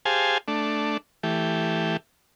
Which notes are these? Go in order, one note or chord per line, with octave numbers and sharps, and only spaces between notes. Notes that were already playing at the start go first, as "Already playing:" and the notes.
G4 G#4 C5 F5 G#5 A5
A3 D4
E3 A3 G4